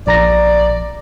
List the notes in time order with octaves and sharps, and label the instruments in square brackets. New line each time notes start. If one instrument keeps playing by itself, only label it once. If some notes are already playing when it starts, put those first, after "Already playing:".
[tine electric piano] A#1 A#5 A#6 [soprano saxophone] D5